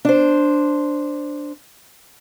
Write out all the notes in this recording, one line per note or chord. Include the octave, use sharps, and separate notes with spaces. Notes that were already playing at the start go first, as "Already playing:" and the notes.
D4 C5